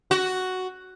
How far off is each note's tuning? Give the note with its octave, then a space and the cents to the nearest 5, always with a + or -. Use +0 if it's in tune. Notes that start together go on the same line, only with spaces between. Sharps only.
F#4 +5